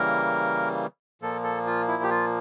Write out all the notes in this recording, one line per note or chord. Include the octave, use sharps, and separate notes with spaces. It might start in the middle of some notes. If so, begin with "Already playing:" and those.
Already playing: C#3 E3 G3 A#3 A#4
A#2 F3 A#3 A4
A4
F4
E4
G4
F4